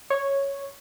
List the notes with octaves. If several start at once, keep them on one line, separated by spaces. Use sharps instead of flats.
C#5